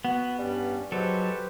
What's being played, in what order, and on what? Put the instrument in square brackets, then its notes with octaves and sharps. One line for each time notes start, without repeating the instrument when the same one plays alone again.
[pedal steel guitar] B3 [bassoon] F#4
[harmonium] G2 C#4 [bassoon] G3
[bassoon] G#2 [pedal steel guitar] F#3 A4 [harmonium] G4 B4 C5